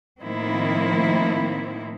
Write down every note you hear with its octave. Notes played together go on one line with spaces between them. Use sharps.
A2 D#3 F3 A#3 C4 E4